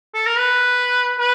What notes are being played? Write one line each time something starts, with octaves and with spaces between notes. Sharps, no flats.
A4
A#4
B4
B4